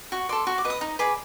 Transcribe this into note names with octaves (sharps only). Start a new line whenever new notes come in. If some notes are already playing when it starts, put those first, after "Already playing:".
F#4 C#6
A4 D5 C6
F#4 C#6
D6
B4 D#5
D#6
D#4
G#4 B4 D5